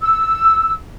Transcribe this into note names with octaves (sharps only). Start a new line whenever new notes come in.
E6